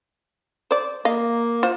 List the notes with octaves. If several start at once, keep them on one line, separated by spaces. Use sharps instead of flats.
C5 D5
A#3 D#5 F5
F4 C5